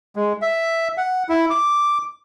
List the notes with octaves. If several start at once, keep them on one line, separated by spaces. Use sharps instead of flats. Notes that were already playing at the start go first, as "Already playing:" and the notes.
G#3
E5
F#5
E4
D6